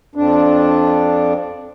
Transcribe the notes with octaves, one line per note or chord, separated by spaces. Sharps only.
F2 D4